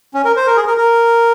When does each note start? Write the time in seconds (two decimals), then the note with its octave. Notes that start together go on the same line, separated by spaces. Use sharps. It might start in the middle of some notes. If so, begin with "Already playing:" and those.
0.14 C#4
0.25 A#4
0.36 C5
0.47 A#4
0.57 G#4
0.67 A#4
0.78 A#4